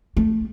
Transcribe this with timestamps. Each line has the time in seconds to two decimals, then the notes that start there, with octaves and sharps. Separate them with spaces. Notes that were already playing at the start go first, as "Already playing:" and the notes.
0.17 A3